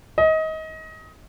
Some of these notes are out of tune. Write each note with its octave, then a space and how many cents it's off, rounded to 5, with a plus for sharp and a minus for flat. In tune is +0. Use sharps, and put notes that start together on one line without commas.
D#5 +25